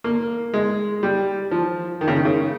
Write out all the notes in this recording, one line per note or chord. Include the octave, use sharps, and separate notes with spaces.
A#3
G#3
G3
F3
D#3
C#3
D#3
C#3